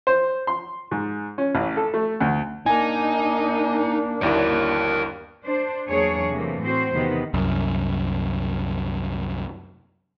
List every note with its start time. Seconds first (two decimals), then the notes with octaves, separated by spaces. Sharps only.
0.07 C5
0.47 C6
0.91 G#2
1.38 C#4
1.55 A1
1.77 A4
1.94 A3
2.21 D2
2.66 A#3 D4 D#4 G#5
4.21 G1 D#2 E4 A#4 C#5 D5
5.45 D4 C5
5.89 E2 F#3 A#3 D4 G#4 C#5
6.32 C3 E3 A3 A#3
6.62 A2 C4 F#4 C5
6.92 E2 C3 D#3 B3 D#4
7.34 C2 F#2